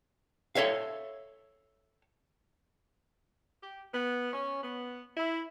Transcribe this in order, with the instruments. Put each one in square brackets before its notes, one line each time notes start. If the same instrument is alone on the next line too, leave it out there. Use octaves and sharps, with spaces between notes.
[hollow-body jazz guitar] A4 C#5 E5 F5
[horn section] G4
B3
C#4
B3
E4